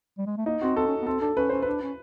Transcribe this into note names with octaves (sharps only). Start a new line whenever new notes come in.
G3
G#3
A3
A#3 D#4
C4 F#4
C4 A4
C#4
B3
C4 A4
D4 A4
C#4 B4
C#4 C5
D4 B4
C#4